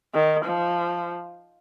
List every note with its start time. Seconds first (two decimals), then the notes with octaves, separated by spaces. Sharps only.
0.15 D#3
0.45 F3